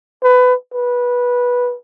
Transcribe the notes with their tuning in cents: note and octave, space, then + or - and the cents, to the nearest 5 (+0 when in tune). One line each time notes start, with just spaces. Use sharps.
B4 +20
B4 -15